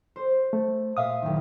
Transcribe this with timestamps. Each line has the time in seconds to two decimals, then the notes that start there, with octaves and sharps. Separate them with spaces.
0.16 C5
0.53 A3
0.97 A#2 E5 F5 D#6
1.22 F#1 D#3